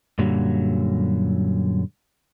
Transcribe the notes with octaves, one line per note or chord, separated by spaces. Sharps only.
F#2 A#2 D3 F#3 G3